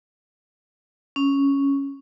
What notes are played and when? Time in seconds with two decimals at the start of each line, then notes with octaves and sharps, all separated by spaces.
1.16 C#4